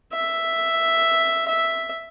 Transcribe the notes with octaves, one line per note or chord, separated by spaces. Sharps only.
E5
E5